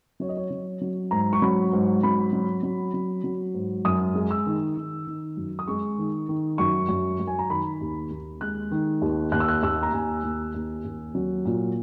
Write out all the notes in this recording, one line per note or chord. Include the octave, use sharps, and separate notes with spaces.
F#3 C#5
D#5
C#5
F#3
F#3
G#2 A#5
C#6
F#3 B5
G#2
F#3 B5
F#3
F#3
F#3
F#3
G#2
F#2 D#6
G#3
E6
D#3
D#3
D#3
F#2
D#6
G#3 C#6
D#3
D#3
F#2 C#6
F#2
F#2
G#5
A#5
D#3 B5
D#2
D#2
G#3 F#6
D#3
D#2
D#2 F#6
E6
F#6
D#2 E6
A#5
D#2 G#5
D#2
D#2
D#2
F#3
A#2